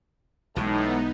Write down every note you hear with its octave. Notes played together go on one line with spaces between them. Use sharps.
B1 A2 E3 G#3 B3 D#4